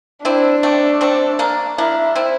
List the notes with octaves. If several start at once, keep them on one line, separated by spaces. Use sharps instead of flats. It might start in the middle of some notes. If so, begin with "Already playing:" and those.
C4 D4 E4
A3 C4
A3 C4
A#3 D4
A#3 D4 E4
C4 E4